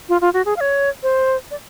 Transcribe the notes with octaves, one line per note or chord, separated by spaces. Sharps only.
F4
F4
F#4
G#4
F5
C#5
C5
D5